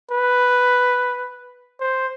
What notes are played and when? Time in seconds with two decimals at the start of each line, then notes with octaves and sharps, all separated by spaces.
0.11 B4
1.80 C5